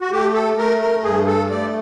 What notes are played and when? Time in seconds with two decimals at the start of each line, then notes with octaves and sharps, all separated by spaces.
0.01 F#4
0.11 A3 G4
0.33 A4
0.57 A3 A#4
0.80 A#4
1.03 G2 G#4
1.26 A4
1.49 A3 D5